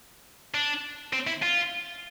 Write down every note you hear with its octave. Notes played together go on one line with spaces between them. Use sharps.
D4
C4
E4
F4